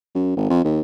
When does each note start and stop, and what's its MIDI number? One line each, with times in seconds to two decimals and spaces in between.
0.15 0.36 42
0.37 0.48 32
0.50 0.61 41
0.64 0.81 39